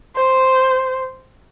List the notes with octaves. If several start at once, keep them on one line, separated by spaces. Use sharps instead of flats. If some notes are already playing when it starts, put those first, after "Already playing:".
C5